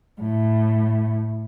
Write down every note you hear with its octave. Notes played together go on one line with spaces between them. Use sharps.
A2